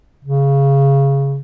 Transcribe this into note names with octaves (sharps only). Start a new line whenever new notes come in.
C#3